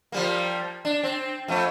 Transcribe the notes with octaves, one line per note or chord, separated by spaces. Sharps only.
F3 G3 A#3
D4
C4
F2 A3